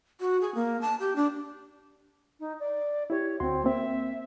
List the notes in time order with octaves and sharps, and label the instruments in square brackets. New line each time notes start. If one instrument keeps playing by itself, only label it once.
[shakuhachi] F#4
G#4
A#3
A5
G4
D4
[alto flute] D#4
D5
[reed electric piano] E4 G4 [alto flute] C#5
[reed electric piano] D2 F#4 C6 [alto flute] C4
[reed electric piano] A#3 C4 [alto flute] E5